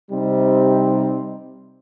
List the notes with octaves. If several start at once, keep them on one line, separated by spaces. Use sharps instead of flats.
C3 G3 C4 D#4